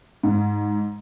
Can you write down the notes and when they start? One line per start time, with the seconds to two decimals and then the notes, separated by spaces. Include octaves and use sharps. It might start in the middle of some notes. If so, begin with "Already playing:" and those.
0.23 G#2